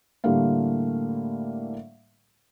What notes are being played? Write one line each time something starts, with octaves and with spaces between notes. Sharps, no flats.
A2 D3 G3 A3 A#3 F5